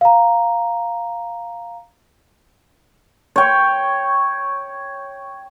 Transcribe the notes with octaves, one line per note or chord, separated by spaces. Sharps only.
F5 A#5
C#5 G5